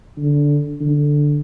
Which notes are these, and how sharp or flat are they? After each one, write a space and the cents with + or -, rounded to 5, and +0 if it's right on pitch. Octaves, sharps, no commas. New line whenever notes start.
D3 -10
D3 +0